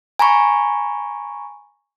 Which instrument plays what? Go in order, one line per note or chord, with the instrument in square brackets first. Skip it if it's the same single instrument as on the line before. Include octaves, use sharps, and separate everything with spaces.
[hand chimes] G#5 A#5 B5 C#6